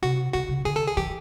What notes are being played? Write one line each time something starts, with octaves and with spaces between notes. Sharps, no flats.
C3 F#4
C#3 F#4
C#3
D3 G#4
A4
G#4
E3 G4